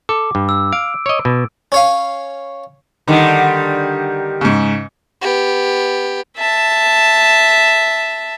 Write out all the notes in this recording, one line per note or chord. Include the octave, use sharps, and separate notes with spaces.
A4 D6
G2
E6
F5 D7
C#5 D#5
B2
C#4 C#5 F5
D3 D#3 G3 D#4
G#2 C#3
B3 G4
E5 A5